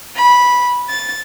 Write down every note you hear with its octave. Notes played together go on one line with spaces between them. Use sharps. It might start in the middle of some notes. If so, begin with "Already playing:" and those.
B5
A6